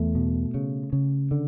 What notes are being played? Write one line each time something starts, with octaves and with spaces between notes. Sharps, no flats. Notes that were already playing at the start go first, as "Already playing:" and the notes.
Already playing: E2 A3
B2
C#3
C#3
D3